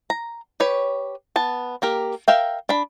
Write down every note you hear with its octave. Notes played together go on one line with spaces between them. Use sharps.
A#5
G4 B4 C#5
B3 A5
A#3 G4 A#4
A#4 E5 F5 G5
D4 B5